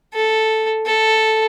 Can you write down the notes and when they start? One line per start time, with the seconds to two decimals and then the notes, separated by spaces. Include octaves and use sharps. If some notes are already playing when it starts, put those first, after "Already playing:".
0.14 A4
0.86 A4